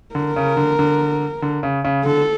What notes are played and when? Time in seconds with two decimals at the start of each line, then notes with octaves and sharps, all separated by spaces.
0.15 D3 A#4
0.36 C#3
0.57 D3
0.79 D3
1.42 D3
1.63 C#3
1.85 C#3
2.05 D3 A4